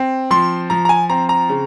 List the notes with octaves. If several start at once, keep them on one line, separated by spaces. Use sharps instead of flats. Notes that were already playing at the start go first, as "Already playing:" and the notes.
Already playing: C4
F3 C6
F3 A#5
A#5
G#5
C4 A#5
A#5
C#3